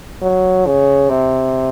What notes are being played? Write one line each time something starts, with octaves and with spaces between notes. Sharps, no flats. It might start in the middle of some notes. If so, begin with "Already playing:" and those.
F#3
C#3
C3